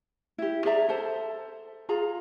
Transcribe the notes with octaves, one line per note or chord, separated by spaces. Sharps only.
E4 G4
G#4 D5 E5 A#5
A4 C5 A5
F4 G#4 A#5